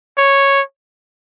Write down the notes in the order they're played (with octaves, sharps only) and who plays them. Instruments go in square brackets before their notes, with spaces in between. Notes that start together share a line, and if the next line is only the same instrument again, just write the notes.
[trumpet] C#5